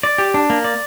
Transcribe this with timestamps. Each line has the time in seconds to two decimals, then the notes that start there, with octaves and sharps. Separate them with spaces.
0.03 D5
0.18 G4
0.34 D4
0.50 A#3
0.64 D5